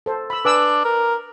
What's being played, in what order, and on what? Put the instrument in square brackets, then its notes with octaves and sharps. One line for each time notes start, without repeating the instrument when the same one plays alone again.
[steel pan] A4 C5
B5 E6
[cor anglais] D4 [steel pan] B4 G#5 E6
[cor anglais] A#4